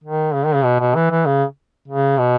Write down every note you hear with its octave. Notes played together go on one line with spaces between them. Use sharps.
D#3
C#3
D#3
C#3
B2
B2
E3
E3
C#3
C#3
B2